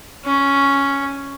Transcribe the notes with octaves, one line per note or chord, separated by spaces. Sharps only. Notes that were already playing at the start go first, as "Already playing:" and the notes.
C#4